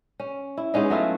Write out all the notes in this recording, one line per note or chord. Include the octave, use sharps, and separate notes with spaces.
C#4
E4
G#3 B3 C#4 D#4
F#3 A3 E4 F4